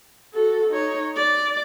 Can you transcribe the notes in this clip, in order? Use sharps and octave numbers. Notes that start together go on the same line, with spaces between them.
F#4 A4
D#4 C#5
D5